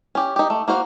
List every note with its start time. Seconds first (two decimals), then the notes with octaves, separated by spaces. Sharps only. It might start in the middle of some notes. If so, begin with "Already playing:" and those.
0.15 C#4 G4
0.36 D#4 G4
0.50 A3
0.68 A#3 F#4 C5 F5